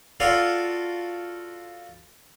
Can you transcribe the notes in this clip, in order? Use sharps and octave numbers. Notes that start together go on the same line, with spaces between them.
F4 F#4 A4 D5 F5